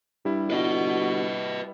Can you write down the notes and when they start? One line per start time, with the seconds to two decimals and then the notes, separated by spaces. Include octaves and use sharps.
0.25 G2 G3 E4
0.50 G1 F#4 B4 D#5